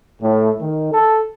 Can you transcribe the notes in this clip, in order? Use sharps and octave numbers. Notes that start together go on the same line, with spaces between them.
A2
D#3
A4